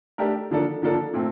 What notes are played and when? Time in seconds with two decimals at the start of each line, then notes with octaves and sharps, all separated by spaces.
0.18 A3 D4 G4 A#4
0.51 D3 F3 A#3 D4 A4
0.82 D3 F3 A#3 D4 A4
1.13 A#2 A3 C4